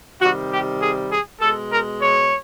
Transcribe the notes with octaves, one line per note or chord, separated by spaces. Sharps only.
C3 D#3 G3 F#4
G4
G#4
G#4
B2 G#3 A4
A#4
C#5